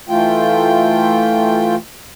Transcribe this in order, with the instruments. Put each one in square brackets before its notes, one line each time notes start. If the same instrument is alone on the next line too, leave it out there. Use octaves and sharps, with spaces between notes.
[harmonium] E3 A3 F4 G5